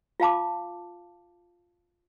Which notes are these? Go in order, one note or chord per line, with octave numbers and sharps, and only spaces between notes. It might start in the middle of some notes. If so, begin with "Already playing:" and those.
F4 F5 A5 D6